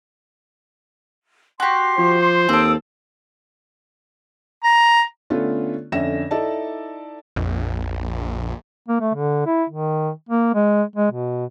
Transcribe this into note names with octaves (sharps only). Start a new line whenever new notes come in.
F#4 G4 C6 D6
F3 C5
D#2 C4 A4 G5 D#6 E6
A#5
D3 A3 B3 C#4 F4
F2 D3 C#4 E5 A#6 E7
D#4 E4 A4 D5 A5
A#1 F2
A#3
A3
D3
E4
D#3
A#3
G#3
G#3
B2